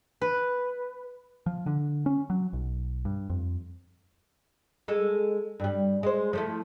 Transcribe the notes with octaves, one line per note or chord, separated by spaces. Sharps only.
B4
F3
D3
C#4
F#3
B1
G2
F2
G#3 A4
G2 G3
G#3 C5
F3 A3 E4